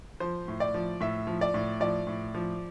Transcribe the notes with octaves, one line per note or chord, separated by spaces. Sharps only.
F3 C5
A2
D5
F3
A2 E5
F3
D5
A2
F3 D5
A2
F3